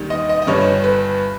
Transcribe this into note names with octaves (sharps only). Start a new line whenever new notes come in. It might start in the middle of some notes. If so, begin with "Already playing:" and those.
Already playing: D#2 D#3 G3
D#5
D#5
D#5
G1 G2 G3 C#5
B4